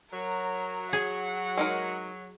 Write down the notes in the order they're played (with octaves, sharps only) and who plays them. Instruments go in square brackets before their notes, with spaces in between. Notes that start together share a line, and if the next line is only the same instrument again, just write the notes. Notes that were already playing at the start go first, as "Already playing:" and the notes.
[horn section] F#3 [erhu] A#4
[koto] G#4 [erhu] F#5
[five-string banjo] G#3 D#4 A#4